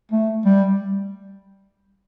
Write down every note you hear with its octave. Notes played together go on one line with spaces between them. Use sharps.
A3
G3